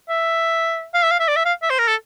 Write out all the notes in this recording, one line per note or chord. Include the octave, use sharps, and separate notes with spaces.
E5
F5
E5
F5
E5
D5
E5
F5
E5
C5
A#4
A4